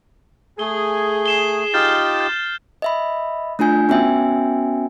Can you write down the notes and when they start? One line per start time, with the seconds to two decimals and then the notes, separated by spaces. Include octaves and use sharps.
0.59 A3 G#4 G7
1.26 C7 E7 G7
1.74 D#4 F4 G4 F6 G6 A6
2.20 G6
2.82 D#5 E5 B5
3.59 A3 D4 F4 G#5 G6
3.89 B3 C#4 F#4 E5 G5 G#5